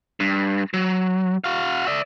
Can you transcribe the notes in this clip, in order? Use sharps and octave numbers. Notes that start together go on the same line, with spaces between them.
G2
F#3
F#4 F5
D5 E5